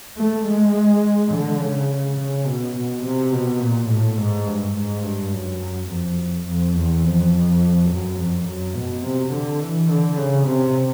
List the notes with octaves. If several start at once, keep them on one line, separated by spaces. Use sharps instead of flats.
A3
G#3
D3
C#3
C#3
B2
B2
C3
B2
A#2
A2
G#2
G2
G#2
G2
F#2
F2
F2
E2
F2
F#2
F2
F#2
B2
C3
D3
E3
D3
C#3
C3